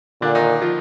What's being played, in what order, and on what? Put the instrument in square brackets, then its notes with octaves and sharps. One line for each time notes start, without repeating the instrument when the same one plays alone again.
[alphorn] A#2 [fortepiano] D3 D4
[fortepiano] D#3 D#4
F3 F4